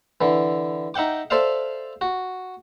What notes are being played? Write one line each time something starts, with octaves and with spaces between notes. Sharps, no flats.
D3 E3
D#4 E5 F#5 G5 D6
A4 C5 D5 E5 F5
F#4